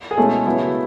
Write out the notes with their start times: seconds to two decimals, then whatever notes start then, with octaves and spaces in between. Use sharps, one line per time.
0.11 G#4
0.17 B2 G#3 A3 C#4 E4 A4
0.46 C#3 F#3 B3 E4